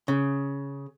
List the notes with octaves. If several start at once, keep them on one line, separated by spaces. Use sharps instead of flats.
C#3